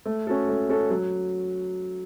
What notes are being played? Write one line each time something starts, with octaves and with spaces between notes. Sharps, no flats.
A3
C#4 F#4 A4
A3
C#4 F#4 A4
F#3